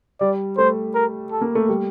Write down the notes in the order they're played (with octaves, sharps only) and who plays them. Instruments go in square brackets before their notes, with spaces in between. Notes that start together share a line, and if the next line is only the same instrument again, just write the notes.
[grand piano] G3 [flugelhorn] D5
[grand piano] A3 [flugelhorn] C5
[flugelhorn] A#4
A4
[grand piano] A#3
A3
G3